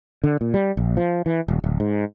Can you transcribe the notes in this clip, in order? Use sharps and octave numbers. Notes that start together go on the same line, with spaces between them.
D3
A#2
G3
A#1
F3
E3
D#1
D1
G#2